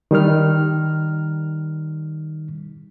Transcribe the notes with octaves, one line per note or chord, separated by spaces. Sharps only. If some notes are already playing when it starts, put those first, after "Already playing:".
D#3 G3 D#4 F6